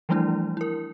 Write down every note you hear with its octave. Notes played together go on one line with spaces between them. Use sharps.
E3 F3 G3 A3 D4 E4
E4 A#4